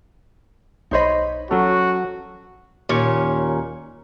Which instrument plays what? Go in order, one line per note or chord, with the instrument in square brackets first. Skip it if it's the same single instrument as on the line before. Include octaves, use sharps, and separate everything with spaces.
[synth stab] B1 C#5 B5 [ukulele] D#4 C5 D#5
[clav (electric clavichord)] F#3 A4 [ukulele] C#4 [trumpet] F#4
[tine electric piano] D#2 C#4 C#6 [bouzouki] A#2